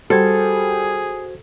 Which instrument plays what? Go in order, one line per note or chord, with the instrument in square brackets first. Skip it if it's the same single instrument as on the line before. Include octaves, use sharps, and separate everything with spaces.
[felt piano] G3 [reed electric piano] F#4 C5 G#6 [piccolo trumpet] G#4 [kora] A4